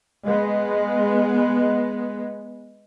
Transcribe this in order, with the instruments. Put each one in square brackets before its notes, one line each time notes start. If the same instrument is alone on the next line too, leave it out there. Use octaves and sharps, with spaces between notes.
[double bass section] G#3 B3